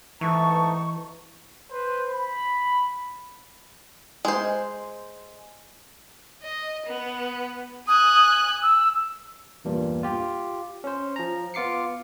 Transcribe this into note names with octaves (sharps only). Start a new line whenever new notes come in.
G#2 E3 A3 D#4 A5 C#6
B4 C5
B5
G#3 C5
D#5
B3
G#5 D#6 F#6
E6
E2 G2 A#2
F4 G4
C#4 C5
F3 A#5
B3 F4 D6 C7 C#7